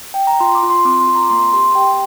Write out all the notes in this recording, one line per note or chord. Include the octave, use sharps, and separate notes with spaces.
G5
A#5
F4 C6
D6
F4
C6
C4 D6
C6
F4
A#5
A#3 C6
G4 C6
G4 G5